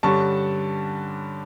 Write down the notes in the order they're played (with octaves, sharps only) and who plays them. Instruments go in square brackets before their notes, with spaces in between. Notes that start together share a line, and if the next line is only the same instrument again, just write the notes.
[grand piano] G2 D3 G3 C#4 A5 C#6